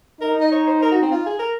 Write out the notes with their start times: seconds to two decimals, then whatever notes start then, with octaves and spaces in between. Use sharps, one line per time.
0.21 D#4 A#4
0.41 D#5
0.51 C#5
0.67 C5
0.82 A#4
0.92 F#4
1.02 C4
1.12 F4
1.26 G#4
1.39 A#4